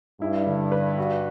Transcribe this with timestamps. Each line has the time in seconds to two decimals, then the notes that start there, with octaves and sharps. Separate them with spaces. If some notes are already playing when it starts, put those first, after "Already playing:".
0.21 G2 E4
0.47 D3
0.72 B4
0.98 F#4